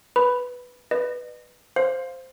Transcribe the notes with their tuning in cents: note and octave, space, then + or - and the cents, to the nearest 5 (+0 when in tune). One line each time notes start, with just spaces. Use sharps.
B4 +0 B5 +0
B4 +0 D#5 -45
C5 +0 F5 +0